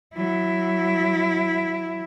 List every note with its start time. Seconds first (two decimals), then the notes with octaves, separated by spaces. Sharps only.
0.15 F#3 E4